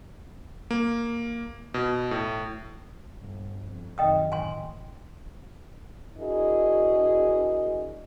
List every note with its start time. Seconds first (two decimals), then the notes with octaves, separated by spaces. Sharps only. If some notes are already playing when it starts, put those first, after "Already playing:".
0.71 A#3
1.74 B2
2.11 A2
3.20 G1 G2
3.62 F2
3.98 F#2 C3 D#3 D#5 G5 D#6
4.32 A1 G#5 C6
6.18 D4 E4 F#4 G#4 A#4 D#5